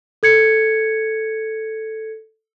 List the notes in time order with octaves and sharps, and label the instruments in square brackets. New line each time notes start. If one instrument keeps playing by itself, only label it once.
[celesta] A4 G#6 C#7